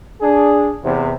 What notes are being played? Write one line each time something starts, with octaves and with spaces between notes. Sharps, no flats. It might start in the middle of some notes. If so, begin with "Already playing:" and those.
D4 G#4
E2 C3